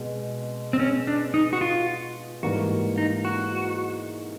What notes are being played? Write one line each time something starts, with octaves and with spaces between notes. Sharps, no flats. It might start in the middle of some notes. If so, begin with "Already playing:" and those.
Already playing: B2 G#3
C4
C#4
D4
D#4
F#4
F4
G#2 E3 G3 A#3 F#4
D#4
F#4